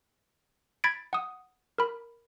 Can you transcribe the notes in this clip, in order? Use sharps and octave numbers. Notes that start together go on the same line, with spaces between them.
B5 G#6 A6 B6 D7
F#5 D#6
A#4 B5